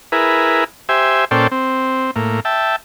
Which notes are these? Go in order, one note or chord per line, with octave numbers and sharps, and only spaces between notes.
E4 G#4 A#4 B4
G4 C5 E5 G#5
A#2 C#4 A4 C5 D5 G5
C4
A2 A#3
E5 G5 A5